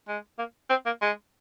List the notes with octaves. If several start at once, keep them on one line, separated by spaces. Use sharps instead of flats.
G#3
A#3
C4
A#3
G#3